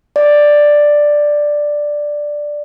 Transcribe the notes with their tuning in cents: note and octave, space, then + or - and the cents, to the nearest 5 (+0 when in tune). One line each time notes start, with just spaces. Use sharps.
D5 +5